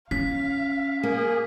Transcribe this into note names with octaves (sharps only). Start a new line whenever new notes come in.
C#4 F5 B6
A#3 G#4